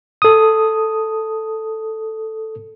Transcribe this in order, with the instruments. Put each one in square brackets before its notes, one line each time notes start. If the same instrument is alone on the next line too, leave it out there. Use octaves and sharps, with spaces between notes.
[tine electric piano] A4 D#6